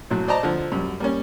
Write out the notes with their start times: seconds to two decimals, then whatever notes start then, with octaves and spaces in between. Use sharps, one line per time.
0.10 A#1 A2 F#3
0.28 C5 D5 D#5 A5 A#5
0.43 D3 F3
0.72 F#2 G3
1.00 G3 A#3 C#4